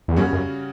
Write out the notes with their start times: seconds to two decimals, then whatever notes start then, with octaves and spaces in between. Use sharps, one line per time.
0.08 E2
0.16 F#2 C#3 G3 C#4 F#4
0.33 F#2